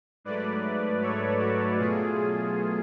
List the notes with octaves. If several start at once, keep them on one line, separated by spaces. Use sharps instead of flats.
G#2 F#3 A3 B4 D5
A4 C#5
F#4 A4
B2 F#3 A3 F4 G#4